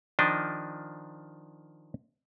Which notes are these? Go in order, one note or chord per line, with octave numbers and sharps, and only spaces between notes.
D#3 F3 D4 D#5